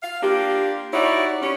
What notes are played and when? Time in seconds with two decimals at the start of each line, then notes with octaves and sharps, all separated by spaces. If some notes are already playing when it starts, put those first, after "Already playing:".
0.03 F5
0.23 A#3 D4 F4 G4
0.93 D#4 E4 F#4 C#5 D5
1.42 G3 C#4